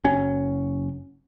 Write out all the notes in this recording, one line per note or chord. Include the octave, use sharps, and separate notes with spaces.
F#1 F#3 C#4